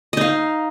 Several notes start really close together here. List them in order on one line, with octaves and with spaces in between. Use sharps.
D#5 D#4 F5